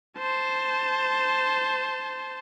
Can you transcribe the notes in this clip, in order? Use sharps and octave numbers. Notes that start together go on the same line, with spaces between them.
C5 A5